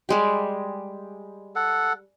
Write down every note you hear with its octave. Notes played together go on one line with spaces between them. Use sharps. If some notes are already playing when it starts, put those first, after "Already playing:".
G3 G#3 G4
A4 F#5